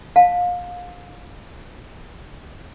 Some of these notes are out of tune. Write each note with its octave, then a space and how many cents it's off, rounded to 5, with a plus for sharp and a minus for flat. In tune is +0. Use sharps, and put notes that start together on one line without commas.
F5 +30 A5 +0